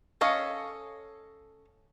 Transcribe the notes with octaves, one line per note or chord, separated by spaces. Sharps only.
C#4 A4 C#5 D#5 F5